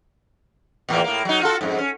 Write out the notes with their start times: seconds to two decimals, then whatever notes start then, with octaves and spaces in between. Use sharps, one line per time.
0.89 E2 A2 A#3
1.04 A2 A#3
1.25 F#3 D#4
1.42 F4 F#4 A4
1.61 F2 G#2
1.78 C#4